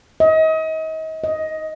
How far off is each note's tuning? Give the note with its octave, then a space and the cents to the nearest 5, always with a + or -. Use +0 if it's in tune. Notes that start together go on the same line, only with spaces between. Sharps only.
D#5 +35
D#5 +10